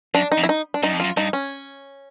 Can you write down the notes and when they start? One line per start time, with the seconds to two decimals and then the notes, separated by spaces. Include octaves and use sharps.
0.14 F#2 D4
0.32 D#4
0.38 F2
0.43 E4
0.49 D#4
0.74 D4
0.83 F#2 D#4
0.93 F2
1.00 F#2 F4
1.17 G2 D#4
1.33 C#4